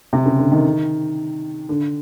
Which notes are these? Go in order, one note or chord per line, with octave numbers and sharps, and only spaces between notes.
C3
C#3
D3
D#3
D3